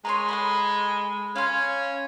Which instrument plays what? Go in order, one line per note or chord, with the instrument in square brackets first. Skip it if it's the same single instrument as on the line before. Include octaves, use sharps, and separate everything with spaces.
[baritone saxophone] G#3 [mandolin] B4 C#5 C6 [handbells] A#5
[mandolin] A4 F#5 C6 [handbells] B5
[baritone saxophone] C#4 [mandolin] F5 C6